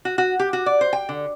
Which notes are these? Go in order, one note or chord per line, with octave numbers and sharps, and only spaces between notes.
F#4
F#4
G4
F#4
D5
C5
G5
D3